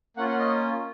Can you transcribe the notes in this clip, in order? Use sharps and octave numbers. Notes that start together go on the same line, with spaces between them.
A#3 C#4 F4 F#5
F#5
D#5